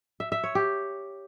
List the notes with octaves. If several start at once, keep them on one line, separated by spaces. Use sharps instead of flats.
E5
E5
C#5
G4